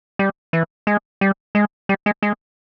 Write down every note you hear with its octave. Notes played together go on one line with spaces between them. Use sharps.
G3
E3
G#3
G3
G#3
G3
G#3
G#3